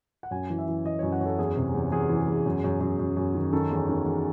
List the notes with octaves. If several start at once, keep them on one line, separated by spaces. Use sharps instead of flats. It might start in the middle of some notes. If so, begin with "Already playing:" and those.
F#5
F#2 G#5
E3
E5
E3
E3 D#5
F#2 C#5
F#5
F#2
A4
E2 G#4
C3
E2
E2 G#4
E3
E2
F#2
F#2
F#2
F#2
F#2
D#3
D#3 A4
E2
D#3
E2